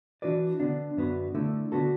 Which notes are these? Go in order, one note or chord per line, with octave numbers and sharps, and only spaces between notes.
E3 D4 F#4 B4 D5
D3 B3 D4
F#2 D3 B3 F#4 B4
D3 A3 E4
D3 B3 F#4 A4